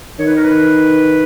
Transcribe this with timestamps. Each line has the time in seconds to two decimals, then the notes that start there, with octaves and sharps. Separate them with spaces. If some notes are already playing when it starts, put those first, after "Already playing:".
0.19 D#3 C#5
0.27 B4
0.36 A#4
0.44 B4